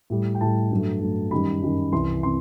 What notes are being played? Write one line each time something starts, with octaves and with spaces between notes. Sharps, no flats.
A2 G3
G5
A2 G3 A5
G2 F#3 A3
G2 F#3 A3
F#2 D#3 G3 B5
F#2 D#3 G3
C2 C3 E3 C6
C3 C6